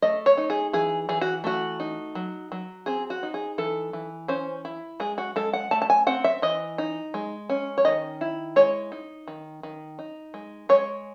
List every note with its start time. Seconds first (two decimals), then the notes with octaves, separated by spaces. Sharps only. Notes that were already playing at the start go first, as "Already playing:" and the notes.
0.02 A3 D#5
0.26 C#5
0.37 D#4
0.50 G#4
0.73 E3 G#4
1.09 E3 G#4
1.21 F#4
1.44 A3 F#4
1.80 D#4
2.15 F#3
2.52 F#3
2.86 C4 G#4
3.10 F#4
3.23 D#4
3.34 G#4
3.58 E3 A4
3.93 E3
4.28 C#4 C5
4.65 E4
5.00 G#3 G#4
5.18 F#4
5.36 G#3 A4
5.53 F#5
5.71 A3 A5
5.82 A5
5.90 G#5
6.07 C4 F#5
6.24 E5
6.42 E3 D#5
6.78 D#4
7.14 G#3
7.49 C#4
7.78 C#5
7.85 D#3 D#5
8.21 E4
8.56 G#3 C#5
8.92 D#4
9.27 D#3
9.63 D#3
9.99 D#4
10.34 G#3
10.69 G#3 C#5